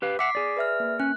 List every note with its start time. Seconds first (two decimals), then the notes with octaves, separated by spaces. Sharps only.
0.02 G4 B4 F5
0.19 E5 F#5 D6 B6 C7
0.35 G#4 D5
0.57 B4 E5 F6
0.80 A#3
1.00 C#4 F#6